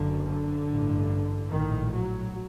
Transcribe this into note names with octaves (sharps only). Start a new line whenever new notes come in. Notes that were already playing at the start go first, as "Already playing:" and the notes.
Already playing: F#1 F#2 D3
D3
A1 G2
A#1 A2 D#3
F#3